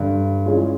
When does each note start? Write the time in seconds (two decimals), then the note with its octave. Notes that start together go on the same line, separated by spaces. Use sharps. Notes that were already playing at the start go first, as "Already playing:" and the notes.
Already playing: G2 D3 G3
0.45 E3 G#3 C#4 F4 G#4